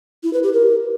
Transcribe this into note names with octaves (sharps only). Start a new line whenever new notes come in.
E4
B4
G4
A#4